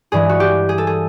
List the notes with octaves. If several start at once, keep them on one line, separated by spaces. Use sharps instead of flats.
G2 E3 G#3 G#4
F#4
G4
G#4
A4
G#4